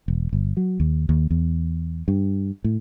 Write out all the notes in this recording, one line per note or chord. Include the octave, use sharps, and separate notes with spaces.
E1
G1
F#3
D#2
D#2
E2
G2
A2